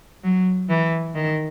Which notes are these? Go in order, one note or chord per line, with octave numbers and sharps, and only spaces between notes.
F#3
E3
D#3